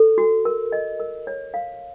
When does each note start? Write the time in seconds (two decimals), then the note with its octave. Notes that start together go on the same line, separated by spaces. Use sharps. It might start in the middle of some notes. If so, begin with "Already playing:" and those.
Already playing: A4
0.18 F#4
0.45 A#4
0.72 D#5
1.00 A#4
1.27 C#5
1.54 F5